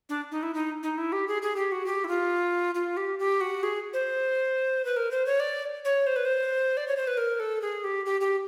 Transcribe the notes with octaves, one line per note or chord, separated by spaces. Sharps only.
D4
D#4
E4
D#4
D#4
E4
G4
G#4
G#4
G4
F#4
G4
E4
F4
F4
G4
G4
F#4
G#4
C5
B4
A#4
C5
C#5
D5
C#5
C5
B4
C5
D5
C#5
C5
B4
A#4
A4
G#4
G4
G4
G4